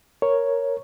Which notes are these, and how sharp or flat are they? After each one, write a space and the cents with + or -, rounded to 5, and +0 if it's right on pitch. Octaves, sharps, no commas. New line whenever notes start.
A#4 +0 C#5 +0